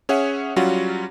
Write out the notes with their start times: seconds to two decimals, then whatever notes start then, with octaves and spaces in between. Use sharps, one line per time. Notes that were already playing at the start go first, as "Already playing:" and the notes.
0.09 C#4 G#4 C#5 E5 F#5
0.56 F#3 G3 C#4 F4 F#4 F#5